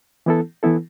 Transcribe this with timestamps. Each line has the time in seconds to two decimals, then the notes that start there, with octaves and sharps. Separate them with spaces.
0.26 E3 B3 E4 A4
0.63 E3 B3 E4 A4